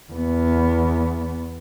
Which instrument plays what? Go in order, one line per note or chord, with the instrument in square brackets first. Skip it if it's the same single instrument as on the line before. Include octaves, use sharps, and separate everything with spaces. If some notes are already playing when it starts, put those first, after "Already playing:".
[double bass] E2 B3